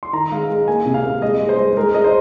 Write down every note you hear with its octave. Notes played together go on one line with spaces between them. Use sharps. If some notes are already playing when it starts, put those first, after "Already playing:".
C6
D#3 A#5
G#3 F5
G#3
A#3 G#5
C3
F5
A#3
G#3 D#5
G#3
C5
G#3
G#3 A#4
G#3 D#5
C5